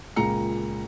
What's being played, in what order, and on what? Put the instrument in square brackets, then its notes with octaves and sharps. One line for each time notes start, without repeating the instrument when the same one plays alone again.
[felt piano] C#2 A#2 G#4 A#5 C#7